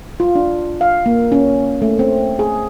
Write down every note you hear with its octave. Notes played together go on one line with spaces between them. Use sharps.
F4
D4
F5
A#3
C#4
A3
C4
G#4